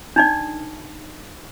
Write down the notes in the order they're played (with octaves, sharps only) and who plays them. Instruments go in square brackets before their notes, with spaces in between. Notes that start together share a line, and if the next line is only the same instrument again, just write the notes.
[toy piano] D4 D#4 D5